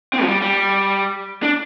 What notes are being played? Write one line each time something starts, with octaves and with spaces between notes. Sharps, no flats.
C4
F3
G3
G3
D4